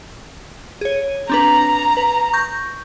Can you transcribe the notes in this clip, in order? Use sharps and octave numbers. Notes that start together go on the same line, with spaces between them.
G#4 C#5
C4 D4 B4 A#5
B4
C#6 G6 A#6